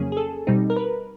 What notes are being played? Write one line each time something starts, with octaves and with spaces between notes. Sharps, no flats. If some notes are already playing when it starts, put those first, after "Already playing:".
Already playing: F2 C#3 F#3 A#3 C#4 G#4
G#4
A4
B2 G3 C4 D#4
A#4
B4